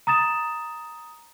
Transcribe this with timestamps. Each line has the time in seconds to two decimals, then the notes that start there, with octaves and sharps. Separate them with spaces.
0.07 A#5 D#6 A6 E7